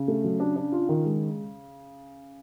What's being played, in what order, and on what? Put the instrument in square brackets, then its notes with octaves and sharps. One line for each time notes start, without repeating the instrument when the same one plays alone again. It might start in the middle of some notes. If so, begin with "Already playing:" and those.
Already playing: [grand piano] C#3
[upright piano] A3
F#3
D4
D4
F4
D#3
G#3